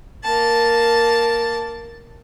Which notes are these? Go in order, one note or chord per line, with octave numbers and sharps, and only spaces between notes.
A#3 A5